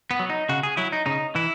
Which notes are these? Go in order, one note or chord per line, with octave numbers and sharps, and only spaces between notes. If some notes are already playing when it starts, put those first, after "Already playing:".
B3
F#3
D#4
C#3 F#4
G#4
F#3 E4
D#4
C#3 D#4
E3 E4